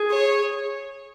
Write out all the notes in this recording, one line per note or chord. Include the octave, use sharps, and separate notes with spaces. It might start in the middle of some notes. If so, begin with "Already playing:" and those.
Already playing: G#4
C#5